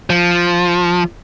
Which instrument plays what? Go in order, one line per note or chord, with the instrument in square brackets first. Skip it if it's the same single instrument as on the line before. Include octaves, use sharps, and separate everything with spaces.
[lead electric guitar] F3